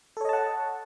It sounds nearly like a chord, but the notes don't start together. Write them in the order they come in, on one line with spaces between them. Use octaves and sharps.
A4 C#5 D#5 A5 F#5